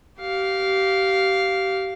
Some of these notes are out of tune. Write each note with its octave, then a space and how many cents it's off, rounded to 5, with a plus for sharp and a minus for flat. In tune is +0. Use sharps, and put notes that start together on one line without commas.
G4 -25 F5 +0